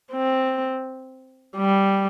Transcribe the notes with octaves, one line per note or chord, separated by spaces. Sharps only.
C4
G3